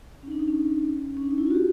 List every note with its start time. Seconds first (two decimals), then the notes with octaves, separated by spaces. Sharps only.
0.23 C#4
0.27 D#4
0.32 D4
0.39 D#4
0.48 C#4
1.17 C#4
1.22 D4
1.31 D#4
1.38 E4
1.47 F4
1.51 F#4
1.54 G4